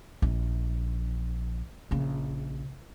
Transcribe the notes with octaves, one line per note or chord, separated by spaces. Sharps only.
A#1
A#1 C#3